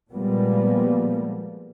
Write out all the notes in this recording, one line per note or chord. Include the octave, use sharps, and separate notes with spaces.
A#2 F3 G3 G#3 A#3 B3